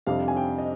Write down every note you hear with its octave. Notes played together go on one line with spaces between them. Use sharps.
F2 C3 G3 D4 F5
G#5
G5
D#5